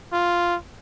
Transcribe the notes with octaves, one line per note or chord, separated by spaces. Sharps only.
F4